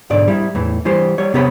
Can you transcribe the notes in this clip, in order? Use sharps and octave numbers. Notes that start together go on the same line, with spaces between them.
B1 G#2 D3 D5
G3 E4
E2 A2 E3
E3 G3 G4 C5
G3 C#5
C3 B3 G4 C#5 F#5 B5